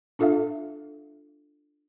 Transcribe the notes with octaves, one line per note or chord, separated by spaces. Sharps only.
D4 F4 A4 E5 F5